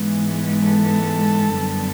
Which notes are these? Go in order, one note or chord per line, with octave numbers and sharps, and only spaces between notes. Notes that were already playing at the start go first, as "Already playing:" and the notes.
Already playing: G#2 E3 G#3 B3
A4
F#2 D3 G3 B3